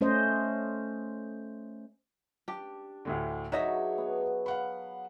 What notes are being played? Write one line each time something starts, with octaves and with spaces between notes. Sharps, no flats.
A3 C#4 C5 D#5
D4 G4
D2 A2 D3
F#3 D#4 G#4 B4 C#5 D#5 E5
B3
F5 F#5 B5